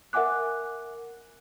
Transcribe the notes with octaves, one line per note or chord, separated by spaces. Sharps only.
A#4 E5 F#5 G#5 D6 F#6